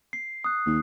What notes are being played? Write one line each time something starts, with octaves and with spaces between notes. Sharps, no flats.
C7
D#6 F#6
D#2